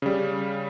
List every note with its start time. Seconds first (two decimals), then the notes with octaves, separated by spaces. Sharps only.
0.02 C#3 G3